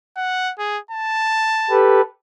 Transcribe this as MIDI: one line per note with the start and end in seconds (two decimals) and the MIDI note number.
0.17 0.53 78
0.59 0.79 68
0.91 1.85 81
1.70 2.01 67
1.70 2.01 69
1.70 2.01 71